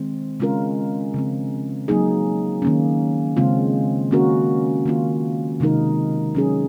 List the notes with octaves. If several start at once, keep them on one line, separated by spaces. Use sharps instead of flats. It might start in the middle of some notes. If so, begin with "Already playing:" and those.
Already playing: D#3 G#3 C4
C#3 G#3 C#4 F4 A#4
C#3 F3 C4
F#3 A#3 D#4 G#4
D#3 A#3 C#4
C#3 G#3 C4 F4
D#3 A#3 C#4 F#4 A#4
D#3 A#3 F4
C3 D#3 G#3 D#4 A#4
F#3 C#4 G#4